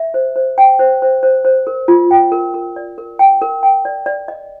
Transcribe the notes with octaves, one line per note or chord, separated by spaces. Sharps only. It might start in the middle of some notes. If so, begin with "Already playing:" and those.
Already playing: E5
C5
C5
G5
C5
C5
C5
C5
A#4
F4
G5
A#4
A#4
D5
A#4
G5
A#4
G5
D5
D5
D#5